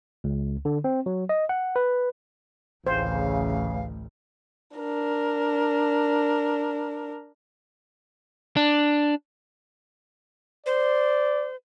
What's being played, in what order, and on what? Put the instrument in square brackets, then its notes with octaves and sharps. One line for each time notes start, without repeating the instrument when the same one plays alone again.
[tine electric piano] C#2
D3
C4
F#3
D#5
F#5
B4
[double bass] A1 D2 [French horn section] C#3 E3 [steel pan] C5 [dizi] F5
[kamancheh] D4 A#4
[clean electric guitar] D4
[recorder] C5 [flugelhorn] D5